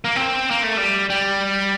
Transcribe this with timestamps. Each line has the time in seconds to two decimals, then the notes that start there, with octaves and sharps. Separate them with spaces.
0.04 A#3
0.16 C4
0.51 A#3
0.64 A3
0.78 G3
1.10 G3